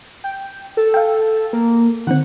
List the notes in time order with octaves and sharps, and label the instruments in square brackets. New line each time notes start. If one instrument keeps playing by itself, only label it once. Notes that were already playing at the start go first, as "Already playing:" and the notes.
[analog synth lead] G5
A4
[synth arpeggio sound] F5 G5
[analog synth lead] A#3
[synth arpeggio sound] D3 D#3 C4 [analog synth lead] F#5